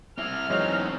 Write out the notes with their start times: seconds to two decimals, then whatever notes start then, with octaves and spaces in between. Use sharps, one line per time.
0.18 C4 E4 F6
0.50 E2 E3 F#3 G#3 C4 C#4 D#4